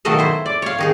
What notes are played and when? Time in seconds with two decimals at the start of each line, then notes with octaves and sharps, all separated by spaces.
0.05 B2 D#3 F#3 A3 D#5 F5
0.19 E4 C5
0.46 D5
0.62 C#5 F5
0.78 D#3 D#4 G#4